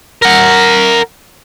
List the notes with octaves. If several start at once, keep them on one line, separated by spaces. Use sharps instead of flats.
A#4 F#5